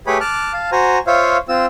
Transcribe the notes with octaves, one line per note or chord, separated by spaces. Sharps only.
A3 G4 G#4 B4 C#5 B5
A5 D6 F6 F#6
F5 A5
F#4 C5 G#5 A#5
F4 C5 C#5 E5 F5
C4 F4 E6